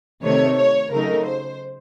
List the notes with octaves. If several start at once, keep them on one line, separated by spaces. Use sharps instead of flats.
C3 D#3 A3 C#5
C#5
C#3 F#3 A3 D#4 A#4
C5